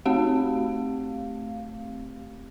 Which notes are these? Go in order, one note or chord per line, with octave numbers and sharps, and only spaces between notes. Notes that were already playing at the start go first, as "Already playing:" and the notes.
A3 C4 G4 F5